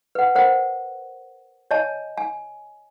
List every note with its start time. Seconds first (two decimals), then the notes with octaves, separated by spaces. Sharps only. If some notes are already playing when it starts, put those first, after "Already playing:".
0.15 B4 F#5
0.35 A#4 C5 F#5
1.71 C#5 D#5 G#5 A5
2.18 G#5